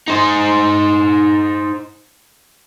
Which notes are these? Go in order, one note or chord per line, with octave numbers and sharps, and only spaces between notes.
D#4 C5